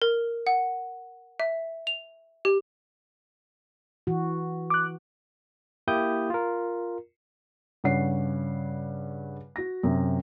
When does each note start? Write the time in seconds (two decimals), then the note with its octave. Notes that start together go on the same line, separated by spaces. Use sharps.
0.02 A#4
0.47 F#5
1.40 E5
1.87 F7
2.45 G4
4.07 E3 F#4
4.70 D6 F#6
5.88 A#3 E4 G4 G5 D#6 G6
6.30 F4 A#4
7.84 G2 C#3 C#5 F#5 C7
9.56 F#4 A#6
9.83 F#2 C3